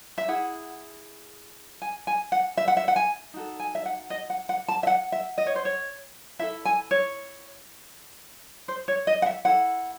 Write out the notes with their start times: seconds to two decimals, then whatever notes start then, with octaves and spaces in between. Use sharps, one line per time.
0.18 E5
0.28 E4 G#4 F#5
1.82 G#5
2.07 G#5
2.32 F#5
2.57 E5
2.68 F#5
2.77 E5
2.88 F#5
2.96 G#5
3.34 D#4 F#4 A4
3.60 G#5
3.75 E5
3.86 F#5
4.10 D#5
4.30 F#5
4.49 F#5
4.68 A5
4.83 E5
4.87 F#5
5.12 E5
5.38 D#5
5.47 C#5
5.56 C5
5.65 C#5
6.39 E4 A4 E5
6.65 G#5
6.91 C#5
8.68 C5
8.88 C#5
9.07 D#5
9.22 F#5
9.26 E5
9.45 E4 A4 F#5